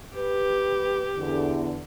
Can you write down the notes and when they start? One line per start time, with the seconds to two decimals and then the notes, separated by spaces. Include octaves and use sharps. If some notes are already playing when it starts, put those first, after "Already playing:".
0.16 G4 B4
1.18 E2 D3